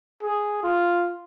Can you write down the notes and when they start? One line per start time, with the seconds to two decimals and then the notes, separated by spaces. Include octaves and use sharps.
0.22 G#4
0.63 F4